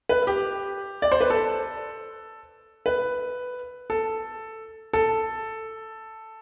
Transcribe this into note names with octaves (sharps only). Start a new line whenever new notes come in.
B4
G4
D5
C5
B4
A4
B4
A4
A4